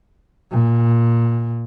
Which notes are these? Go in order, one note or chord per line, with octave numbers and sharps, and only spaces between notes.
A#2